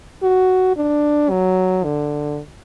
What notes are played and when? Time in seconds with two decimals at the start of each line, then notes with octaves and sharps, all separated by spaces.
0.23 F#4
0.76 D4
1.30 F#3
1.84 D3